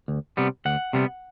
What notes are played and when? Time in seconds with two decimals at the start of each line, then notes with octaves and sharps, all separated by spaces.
0.08 D2
0.37 C3 G3 B3
0.65 D2 F#5
0.93 C3 G3 B3